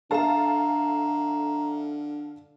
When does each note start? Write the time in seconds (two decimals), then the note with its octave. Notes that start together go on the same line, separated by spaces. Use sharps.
0.11 D3 A4 E5 F5 A5 A#5